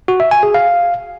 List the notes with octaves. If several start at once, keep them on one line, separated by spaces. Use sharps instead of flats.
F#4
E5
G#5
G#4
F5